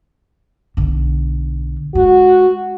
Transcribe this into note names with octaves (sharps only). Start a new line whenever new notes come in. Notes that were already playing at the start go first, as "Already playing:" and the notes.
B1 D3
G#3 F#4